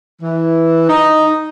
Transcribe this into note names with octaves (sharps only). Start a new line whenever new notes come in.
E3
D#4